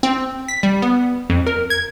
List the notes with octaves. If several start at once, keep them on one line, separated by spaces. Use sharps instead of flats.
C4
B6
G3
B3
F2
A#4
G#6